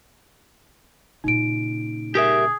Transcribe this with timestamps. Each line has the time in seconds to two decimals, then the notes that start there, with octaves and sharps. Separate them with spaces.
1.24 A#2 C#3 D#4 D7
2.15 G4 G#4 A#4 E5